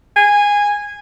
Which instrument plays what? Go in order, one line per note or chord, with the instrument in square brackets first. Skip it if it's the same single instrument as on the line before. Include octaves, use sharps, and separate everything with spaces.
[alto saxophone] G#5